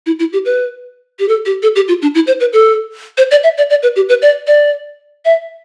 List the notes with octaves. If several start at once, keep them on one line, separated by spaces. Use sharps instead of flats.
E4
E4
G4
B4
G4
A4
G4
A4
G4
F4
D4
E4
C5
B4
A4
C5
D5
E5
D5
D5
B4
G4
B4
D5
D5
E5